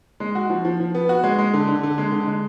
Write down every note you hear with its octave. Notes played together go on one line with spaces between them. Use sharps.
G#3
F#4
F3
F3
F3
B3
F#4
G#3
G#3
D3
D3
D3
G#3
D3
G#3